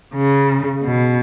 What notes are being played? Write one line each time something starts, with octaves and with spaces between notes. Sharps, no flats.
C#3
B2